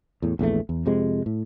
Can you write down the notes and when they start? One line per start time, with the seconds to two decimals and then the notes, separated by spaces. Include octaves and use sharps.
0.22 E2 A2
0.39 A#1 E2 E3 A3
0.69 E2
0.86 F2 C3 G#3
1.26 A2